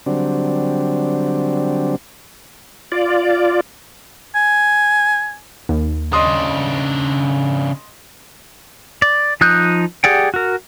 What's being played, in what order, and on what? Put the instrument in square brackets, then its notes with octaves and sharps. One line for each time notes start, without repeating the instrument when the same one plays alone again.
[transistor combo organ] D3 F#3 G3 C4 D4
[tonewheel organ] F4 D5
[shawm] G#5
[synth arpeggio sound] D#2
[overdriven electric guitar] C#3 D4 [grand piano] D#5 C6 D#6
[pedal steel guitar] D5
F3 D#4 D#6 F#6 G6
G4 G#4 D5 F#5 G5
F#4 A#4